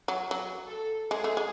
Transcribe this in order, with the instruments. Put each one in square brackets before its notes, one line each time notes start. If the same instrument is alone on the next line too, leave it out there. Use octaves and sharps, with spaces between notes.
[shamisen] F#3
F#3
[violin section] A4
[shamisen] G#3 [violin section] G#4
[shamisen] A3
G#3